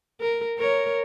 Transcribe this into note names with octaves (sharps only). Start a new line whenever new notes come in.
A#4
A#4 C#5